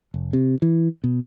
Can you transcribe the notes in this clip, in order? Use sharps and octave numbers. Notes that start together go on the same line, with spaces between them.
F1
C3
E3
B2